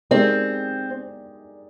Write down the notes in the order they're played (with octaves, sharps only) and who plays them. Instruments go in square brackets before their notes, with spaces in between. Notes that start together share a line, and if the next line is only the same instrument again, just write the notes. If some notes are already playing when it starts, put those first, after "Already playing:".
[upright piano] G#3 D#4 G4 A#4 D5 [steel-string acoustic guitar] C4